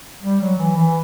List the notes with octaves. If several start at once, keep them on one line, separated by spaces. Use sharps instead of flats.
G3
F#3
E3
E3